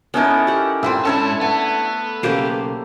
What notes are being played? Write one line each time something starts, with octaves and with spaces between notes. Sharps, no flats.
B3 C#4 D#4 E4 A4 A#4
G4 F#5
G2 A#2 C4 E5 A5 C6
G#2 C#4 D4 E4 A4 C#5 A5
A3 B3
B1 C#3 A#3 G4 C5